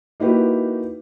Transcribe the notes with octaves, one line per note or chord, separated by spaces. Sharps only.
A#3 D#4 E4 F#4 G4 B4